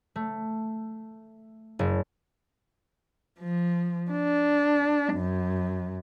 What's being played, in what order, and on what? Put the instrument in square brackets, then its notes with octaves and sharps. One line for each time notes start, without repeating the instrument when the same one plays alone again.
[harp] A3
F#1
[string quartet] F3
D4
F#2